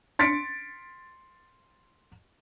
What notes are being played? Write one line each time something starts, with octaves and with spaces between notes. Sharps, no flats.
C6 A6 B6 C#7 D7